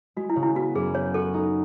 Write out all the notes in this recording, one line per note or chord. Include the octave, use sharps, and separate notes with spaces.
G#3 F#4
E4
C#3
E4
B3 F#4
F#2 G#4
B3 C#5
F#4 A4
D#4